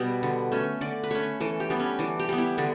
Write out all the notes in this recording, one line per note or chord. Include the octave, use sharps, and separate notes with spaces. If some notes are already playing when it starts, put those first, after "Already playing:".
Already playing: B2 G3 B3 B4
D3
A3 C#4
D3 D5
B4
A3 C#4 C#5
E3 A4
G4
G3 B3 D4
C#4
E3 D4
G4
G3 B3
E4
D3 D4